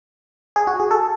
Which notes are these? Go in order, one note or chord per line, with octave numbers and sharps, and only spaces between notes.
G#4
F#4
G#4
A4